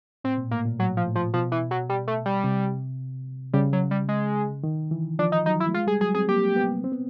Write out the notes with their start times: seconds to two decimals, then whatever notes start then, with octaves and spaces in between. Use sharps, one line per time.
0.24 A2 C4
0.38 A#2
0.51 A2 A#3
0.65 A#2
0.79 A2 F#3
0.97 F3
1.07 A2
1.15 F3
1.34 B2 F3
1.52 E3
1.71 F#3
1.89 G3
2.08 A3
2.26 G3
2.44 C3
3.53 C#3 G3
3.73 F#3
3.91 G3
4.09 G#3
4.64 D#3
4.91 E3
5.19 F3 D4
5.32 D#4
5.46 F#3 D#4
5.60 E4
5.68 A3
5.74 G#3 F4
5.87 G3 G#4
6.01 F#3 G#4
6.15 C4 G#4
6.29 A#3 G4
6.56 B3
6.84 C4
6.92 B3